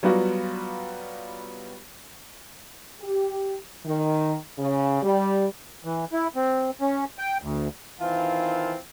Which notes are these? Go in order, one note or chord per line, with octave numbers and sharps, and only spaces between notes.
F#3 G3 B3 F4 F#4
G4
D#3
C#3
G3
E3
E4
C4
C#4
G5
D2
D#3 E3 C4 F4 F5 A5